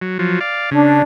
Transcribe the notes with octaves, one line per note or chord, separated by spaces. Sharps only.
F#3
F3 F#3
D5 F5
C#3 D4